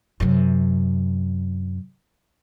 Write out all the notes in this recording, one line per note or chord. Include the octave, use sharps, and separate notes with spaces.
F#2 C3